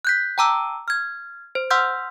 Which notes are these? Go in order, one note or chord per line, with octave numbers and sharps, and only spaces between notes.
F#6 G6 B6
G5 A5 A#5 D6 E6
F6 G#6
C5
F#5 C6 E6 F6 G6